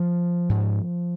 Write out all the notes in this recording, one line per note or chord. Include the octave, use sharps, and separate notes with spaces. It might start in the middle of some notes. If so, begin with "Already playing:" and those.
Already playing: F3
G#2